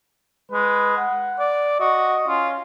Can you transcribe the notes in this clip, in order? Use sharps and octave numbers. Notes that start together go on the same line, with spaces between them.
G#3 B4
F#5
D5
F#4 D#5
C#4 F4